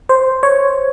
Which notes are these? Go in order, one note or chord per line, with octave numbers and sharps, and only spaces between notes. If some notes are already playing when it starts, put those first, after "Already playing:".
C5
C#5